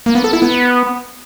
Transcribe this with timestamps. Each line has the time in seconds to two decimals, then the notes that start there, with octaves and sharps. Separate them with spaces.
0.06 A#3
0.15 B3
0.24 A4
0.33 E4
0.42 B3